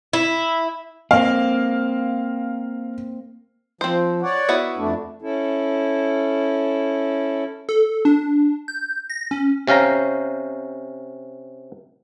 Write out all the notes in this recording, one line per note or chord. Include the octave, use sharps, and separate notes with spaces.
E4
A#3 C4 F5
F3 C4 C5
C#5 D5 F#5
B3 E4 F#4
F2 A3 D4
C#4 E4 A4
A4
D4
G6
A#6
C#4
C3 C#4 F5 G5 A#5